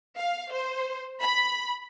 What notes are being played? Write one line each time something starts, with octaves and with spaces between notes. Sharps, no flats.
F5
C5
B5